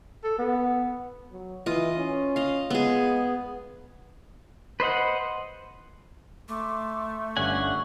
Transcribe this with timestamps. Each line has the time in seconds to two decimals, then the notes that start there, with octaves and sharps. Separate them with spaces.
0.24 A4
0.39 B3
1.32 F#3
1.66 E3 F4 D#5
1.97 C#4
2.36 D#5 F5
2.70 G#3 B3 G#4
4.80 B4 C5 D#5 F#5
6.48 A3 C6 D6
7.37 G1 C#4 D4 F#5 G#5 C#6